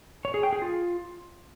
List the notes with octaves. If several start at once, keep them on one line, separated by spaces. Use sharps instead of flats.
C#5
G#4
G5
G#4
F4